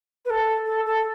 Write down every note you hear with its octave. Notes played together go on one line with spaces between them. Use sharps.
B4
A4
A4
A4